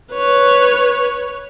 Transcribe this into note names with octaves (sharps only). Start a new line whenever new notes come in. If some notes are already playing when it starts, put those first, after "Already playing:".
B4 C#5